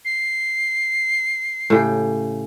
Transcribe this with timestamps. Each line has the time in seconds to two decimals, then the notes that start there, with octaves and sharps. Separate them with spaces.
0.05 C7
1.70 A2 C#3 G4